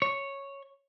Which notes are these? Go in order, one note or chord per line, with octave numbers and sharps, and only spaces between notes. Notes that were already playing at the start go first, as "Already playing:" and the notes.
C#5